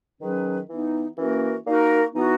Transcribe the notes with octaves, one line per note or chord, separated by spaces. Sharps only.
D#3 F#3 C#4 G#4 B4
E3 B3 D#4
E3 A#3 C#4 F#4 A#4
A#3 D#4 F#4 A#4
E3 B3 D#4 F#4